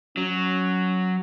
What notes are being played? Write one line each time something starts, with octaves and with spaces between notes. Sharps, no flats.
F#3 C#4